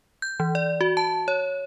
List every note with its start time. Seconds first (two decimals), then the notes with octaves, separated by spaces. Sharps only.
0.22 G6
0.40 E3
0.55 D5
0.81 F#4
0.97 A5
1.28 C#5